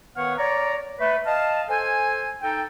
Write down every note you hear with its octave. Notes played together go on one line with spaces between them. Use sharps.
D#3 B3 B4 C#5 F5 F#5
C#5 D5 A#5
A3 B4
D#5 F5 A5
A4 C5 G#5
D#4 A4 G5